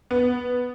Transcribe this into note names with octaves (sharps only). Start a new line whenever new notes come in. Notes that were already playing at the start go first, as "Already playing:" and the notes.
B3